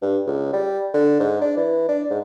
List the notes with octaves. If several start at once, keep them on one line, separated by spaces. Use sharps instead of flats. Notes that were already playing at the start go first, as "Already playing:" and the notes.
G2
C#2
G3
D3
G#2
D4
E3
D4
G#2